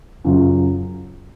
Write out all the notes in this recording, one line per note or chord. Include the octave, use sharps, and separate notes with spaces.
F#2 C#3 F#3 C#4 F4